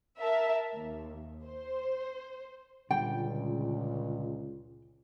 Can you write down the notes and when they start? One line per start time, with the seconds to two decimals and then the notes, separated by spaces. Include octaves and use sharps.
0.20 A#4 E5 A5
0.74 D#2
1.45 C5
2.91 C#2 A#2 D3 G3 G5